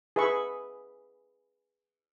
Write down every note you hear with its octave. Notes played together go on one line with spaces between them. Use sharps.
G#4 B4 E5 B5 C#6